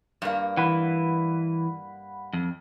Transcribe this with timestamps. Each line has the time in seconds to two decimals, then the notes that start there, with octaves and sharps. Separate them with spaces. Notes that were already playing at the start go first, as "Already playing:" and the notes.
0.22 G2 A#3
0.57 E3 F#5 B5
2.33 F2